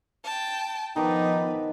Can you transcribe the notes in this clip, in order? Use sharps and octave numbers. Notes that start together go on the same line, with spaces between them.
G5 A5
D#3 F3 B3 D#4 B4 A5 D6